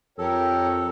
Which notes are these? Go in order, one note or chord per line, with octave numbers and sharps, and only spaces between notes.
F2 G4 A4 A#4 C#5